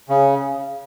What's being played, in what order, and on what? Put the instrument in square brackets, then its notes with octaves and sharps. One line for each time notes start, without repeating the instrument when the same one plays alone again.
[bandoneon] C#3